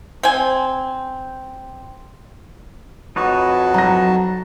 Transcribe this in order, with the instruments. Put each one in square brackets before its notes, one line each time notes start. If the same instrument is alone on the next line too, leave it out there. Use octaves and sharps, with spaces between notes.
[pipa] C4 G#5
[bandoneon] F2 F#4 A5 [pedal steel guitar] D#4 B4 C#5
[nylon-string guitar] F#3 [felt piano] A#5 A#6